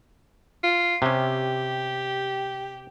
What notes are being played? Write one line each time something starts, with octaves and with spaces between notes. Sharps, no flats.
F4
C3 C#4 G4